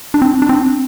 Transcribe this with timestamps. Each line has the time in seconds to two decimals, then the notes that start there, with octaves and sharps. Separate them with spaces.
0.14 D4
0.22 C4
0.42 D4
0.49 C4